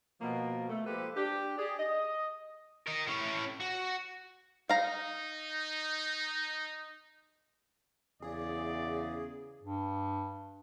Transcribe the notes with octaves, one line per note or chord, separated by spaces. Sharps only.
B2 F3 A#3
A3
F3 G#3 A#3 G4 A4 B4
D4 G4
G4 G#4 D5
D#5
A#4 D#5
A2 C#4
F#4
D#4 F5 A#5
E2 C#3 G#4 D5
G2